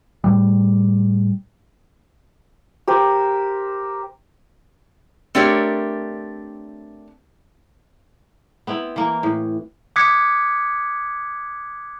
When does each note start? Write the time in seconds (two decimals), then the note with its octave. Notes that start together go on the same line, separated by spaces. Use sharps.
0.24 A2 G3
2.88 G4 A#4 C5
5.35 A3 C4 D4 G4 A#4 C#5
8.67 B3 C4 E4
8.96 E3 A#3
9.23 A2
9.96 D6 D#6 F#6 G#6 B6 C#7